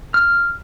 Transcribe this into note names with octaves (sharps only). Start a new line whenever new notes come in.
F6